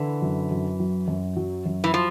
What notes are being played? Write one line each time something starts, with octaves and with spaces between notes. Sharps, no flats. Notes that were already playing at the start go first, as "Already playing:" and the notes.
Already playing: D3 E3
F#2
F#2
F#3
F#2
F#3
F#2
E3
F3